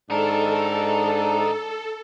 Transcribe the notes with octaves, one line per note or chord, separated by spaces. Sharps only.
G#2 D4 D#4 A4 A#4